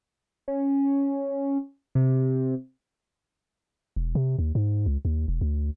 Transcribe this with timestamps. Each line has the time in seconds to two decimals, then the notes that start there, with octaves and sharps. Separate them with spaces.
0.48 C#4
1.95 C3
3.96 E1
4.15 C3
4.39 D#2
4.55 G#2
4.86 C#2
5.05 D#2
5.28 E1
5.41 D2